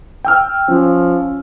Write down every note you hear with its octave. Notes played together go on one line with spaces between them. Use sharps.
G5 E6 F6
F3 C#4